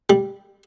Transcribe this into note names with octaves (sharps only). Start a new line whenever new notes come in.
G3